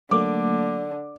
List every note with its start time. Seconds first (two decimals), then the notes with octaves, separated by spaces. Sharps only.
0.11 D3 F#3 A3 A#3 D6